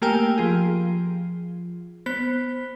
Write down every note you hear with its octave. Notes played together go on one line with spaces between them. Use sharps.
A3 A#3 G4 A#4 G5 G#5
F3 F4 G#4
B3 C5 B6